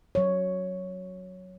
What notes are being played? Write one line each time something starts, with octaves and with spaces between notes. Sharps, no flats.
F#3 C#5